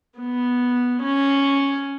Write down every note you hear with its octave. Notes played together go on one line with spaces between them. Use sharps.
B3
C#4